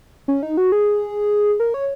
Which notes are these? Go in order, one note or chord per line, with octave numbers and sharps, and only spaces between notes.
C#4
D#4
F#4
G#4
A#4
C#5